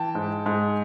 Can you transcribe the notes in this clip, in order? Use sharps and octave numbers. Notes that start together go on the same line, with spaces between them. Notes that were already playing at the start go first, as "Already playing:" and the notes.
Already playing: E3 G5 A5
G#2
G#2